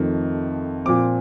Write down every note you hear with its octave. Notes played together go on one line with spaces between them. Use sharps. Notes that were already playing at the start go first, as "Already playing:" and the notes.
Already playing: F2 D#3 A3 D#4
A#2 F3 C4 D6